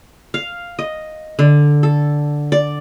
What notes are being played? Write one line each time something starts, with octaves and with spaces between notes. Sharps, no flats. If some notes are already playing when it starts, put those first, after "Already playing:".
F5
D#5
D3
A4
D5